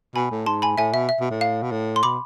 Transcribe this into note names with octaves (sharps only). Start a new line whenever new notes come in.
B2 G#5 B5
A2
G#2 A5 C6
G#5 B5
A2 E5 G#5
B2 E5
E5
B2
A2
F5
B2
A2
C6
B2 B5 D6